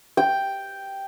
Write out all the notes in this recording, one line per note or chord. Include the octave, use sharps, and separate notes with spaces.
G5